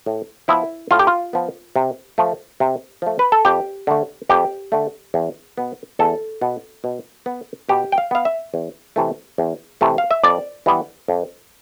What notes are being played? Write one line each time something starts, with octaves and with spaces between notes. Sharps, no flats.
A2
F3 B3 E4
A2 F4
G4
F4
F3 B3
C3
F3 A3
C3
F3 A3
B4
A4
F2 G4
D3 A3
F2 G4
D3 A3
E2
B2 B3
E2 A4
B2 B3
B2
B3
B2 G4
G5
F5
B3 F5
E5
E2
C3 E3 A3
E2
C3 E3 A3
F5
E5
F2 D5
E3 G3 B3
F2